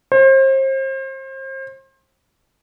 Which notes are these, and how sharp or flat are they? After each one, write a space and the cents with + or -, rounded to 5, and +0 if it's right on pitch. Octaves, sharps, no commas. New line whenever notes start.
C5 +35